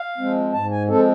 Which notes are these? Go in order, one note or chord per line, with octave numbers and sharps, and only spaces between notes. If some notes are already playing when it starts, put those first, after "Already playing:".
Already playing: F5
F3 G#3 C4
G#2 A5
G#5
F3 G#3 C4 A4